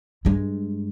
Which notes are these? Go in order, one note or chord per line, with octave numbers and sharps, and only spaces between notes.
G2 G#3